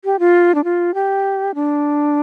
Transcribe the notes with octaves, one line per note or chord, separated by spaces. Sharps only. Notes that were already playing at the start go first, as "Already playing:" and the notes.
G4
F4
D4
F4
G4
D4